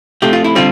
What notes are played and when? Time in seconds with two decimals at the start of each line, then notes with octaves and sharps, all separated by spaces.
0.22 C3 F3 A3 G4
0.33 F4
0.44 E4
0.55 D3 G3 C4 F4